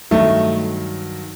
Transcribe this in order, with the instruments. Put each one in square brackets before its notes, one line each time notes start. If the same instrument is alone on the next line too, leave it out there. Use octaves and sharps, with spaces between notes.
[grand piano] G2 D#3 F#3 A3